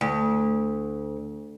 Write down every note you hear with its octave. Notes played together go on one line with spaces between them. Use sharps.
D2